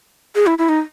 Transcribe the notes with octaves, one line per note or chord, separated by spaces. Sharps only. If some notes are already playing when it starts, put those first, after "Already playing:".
G#4
E4
E4
D#4